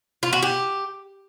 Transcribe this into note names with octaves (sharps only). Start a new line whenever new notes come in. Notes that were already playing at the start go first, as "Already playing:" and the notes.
F4
F#4
G4